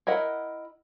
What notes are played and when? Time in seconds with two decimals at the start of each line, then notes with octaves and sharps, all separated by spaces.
0.07 E4 A#4 D#5 F#5